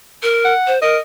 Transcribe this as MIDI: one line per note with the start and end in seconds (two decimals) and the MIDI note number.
0.23 0.53 70
0.45 0.73 78
0.67 0.79 72
0.82 0.97 70
0.82 1.00 75